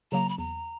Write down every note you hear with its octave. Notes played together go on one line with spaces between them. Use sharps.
C#3 F#3 A#3 A#5
B5
E2 A#5